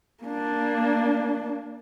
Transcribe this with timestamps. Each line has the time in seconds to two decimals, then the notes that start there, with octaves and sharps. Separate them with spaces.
0.23 A#3 D4